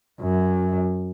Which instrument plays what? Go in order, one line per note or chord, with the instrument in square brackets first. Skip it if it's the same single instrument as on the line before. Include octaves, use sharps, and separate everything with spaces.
[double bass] F#2